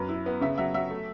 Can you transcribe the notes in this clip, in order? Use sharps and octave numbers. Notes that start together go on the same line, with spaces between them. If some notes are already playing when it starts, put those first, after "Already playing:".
Already playing: F#2 B4
E4
B3
C#3 E5
F#3 E5
F#3 E5
A3